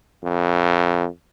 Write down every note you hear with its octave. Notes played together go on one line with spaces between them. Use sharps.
F2